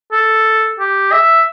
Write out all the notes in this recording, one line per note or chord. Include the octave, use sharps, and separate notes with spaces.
A4
G4
E5